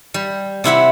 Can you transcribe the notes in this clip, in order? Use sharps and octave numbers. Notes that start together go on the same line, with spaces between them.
G3
C3 E4 F#5 B5